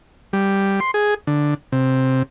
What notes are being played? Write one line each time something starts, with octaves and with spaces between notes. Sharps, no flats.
G3
C6
G#4
D3
C3